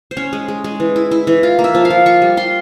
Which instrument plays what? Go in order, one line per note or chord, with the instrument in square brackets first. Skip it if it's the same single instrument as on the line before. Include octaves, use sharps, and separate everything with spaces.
[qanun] C5
C#4 C#5
G#3
G#3
G#3
E3
E4
E4
E3
F4
A#3
E5
F3
F5
F3
F4 C#6
G3
F4 C6